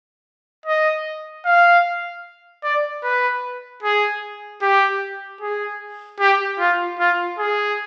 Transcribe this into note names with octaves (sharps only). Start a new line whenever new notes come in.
D#5
F5
D5
B4
G#4
G4
G#4
G4
F4
F4
G#4